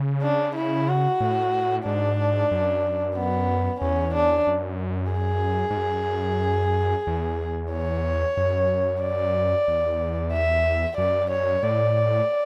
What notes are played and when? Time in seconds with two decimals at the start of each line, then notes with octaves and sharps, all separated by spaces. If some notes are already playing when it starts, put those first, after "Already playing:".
Already playing: C#3
0.22 D4
0.55 E4
0.88 F#4
1.20 A2
1.85 G#2 D4
2.51 F#2
3.16 B3
3.81 E2 C#4
4.14 D4
4.47 F#2
5.12 G#4
5.70 G#2
5.77 F#2
7.07 E2
7.73 C#5
8.37 F#2
9.02 D5
9.68 E2
10.33 E5
10.97 F#2 D5
11.31 C#5
11.63 A2 D5